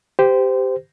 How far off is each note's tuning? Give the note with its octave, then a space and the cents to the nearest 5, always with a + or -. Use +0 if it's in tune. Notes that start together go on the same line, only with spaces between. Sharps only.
G4 +0 C5 -25